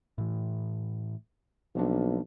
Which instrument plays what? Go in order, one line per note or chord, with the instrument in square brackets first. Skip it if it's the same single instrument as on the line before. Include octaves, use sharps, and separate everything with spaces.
[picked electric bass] A2 E3
[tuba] B1 [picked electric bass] F3 A#3 D4